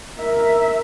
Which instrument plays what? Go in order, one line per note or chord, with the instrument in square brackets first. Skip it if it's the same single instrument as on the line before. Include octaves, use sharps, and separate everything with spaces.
[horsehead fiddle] A#4 E5